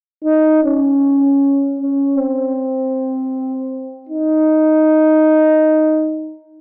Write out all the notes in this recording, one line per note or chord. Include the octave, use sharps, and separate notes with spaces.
D#4
C#4
C#4
C4
D#4